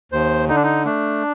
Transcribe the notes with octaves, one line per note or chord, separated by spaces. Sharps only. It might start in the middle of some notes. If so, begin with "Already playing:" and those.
D#2 C5
D3 D#4
D4
D#4
A3 D4